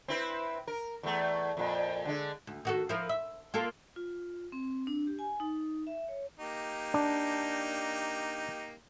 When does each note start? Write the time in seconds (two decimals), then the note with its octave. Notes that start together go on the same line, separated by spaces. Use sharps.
0.08 C4 E4 B4
0.67 A#4
1.03 E2 A3
1.57 F2 A#2
2.05 D3 G#3
2.47 D2
2.65 D#3 F#4 A4
2.89 F3 E4 A#4
3.09 E5
3.54 A#3 F4 A4
3.96 F4
4.52 C4
4.87 D4
5.07 G4
5.19 G#5
5.40 D#4
5.87 E5
6.08 C#5
6.39 A#3 D#4 G4
6.94 D4